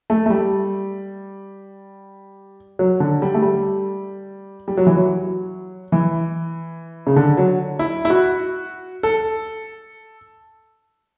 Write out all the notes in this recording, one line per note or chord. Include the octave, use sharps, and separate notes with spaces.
A3
A3
G3
F#3
D3
G3
A3
G3
G3
F#3
E3
F#3
E3
C#3
D3
F#3
E4
E4
F#4
A4